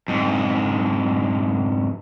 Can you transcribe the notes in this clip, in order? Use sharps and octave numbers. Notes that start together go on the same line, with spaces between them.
F2 G#2